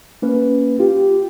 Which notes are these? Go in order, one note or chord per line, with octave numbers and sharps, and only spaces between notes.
A#3 C#4 B4
F4 G4